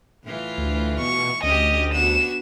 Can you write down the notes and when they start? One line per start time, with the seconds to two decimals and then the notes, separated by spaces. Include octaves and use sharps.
0.24 A2 E3 F4
0.58 D2
1.00 B2 C#6
1.43 D2 C#4 G4 D#5
1.93 B3 D4 F#4 E7